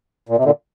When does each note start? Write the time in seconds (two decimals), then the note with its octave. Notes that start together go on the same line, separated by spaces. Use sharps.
0.29 A#2
0.37 C3
0.45 A#2 D3